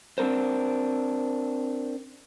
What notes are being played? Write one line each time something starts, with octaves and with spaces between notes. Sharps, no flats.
C4 D4 A#4 C5